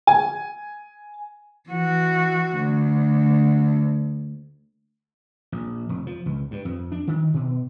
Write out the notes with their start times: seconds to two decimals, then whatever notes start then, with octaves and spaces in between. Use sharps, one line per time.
0.07 G#5
1.69 E3 F#4
2.58 D2
5.52 A#1
5.89 F1
6.07 F3
6.26 C#2
6.51 G2
6.65 F2
6.92 D4
7.07 D#3
7.34 B2